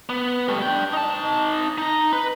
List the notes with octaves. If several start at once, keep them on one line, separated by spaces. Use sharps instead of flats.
B3
G3 A3
D4 G5
D#4 A5
D#4 A#5
B4